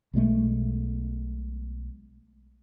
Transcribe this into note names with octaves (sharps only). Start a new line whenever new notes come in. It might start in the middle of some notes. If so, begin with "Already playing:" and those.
B1 B2 G#3 A3